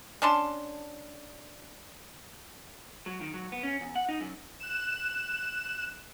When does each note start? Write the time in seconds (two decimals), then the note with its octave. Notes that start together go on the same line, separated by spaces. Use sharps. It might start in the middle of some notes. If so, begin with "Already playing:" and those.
0.22 C#4 D4 A5 C6
3.06 F#3
3.21 D#3
3.34 F#3
3.52 B3
3.63 C#4
3.81 E2
3.96 F#5
4.09 D#4
4.21 F#2
4.60 F#6 E7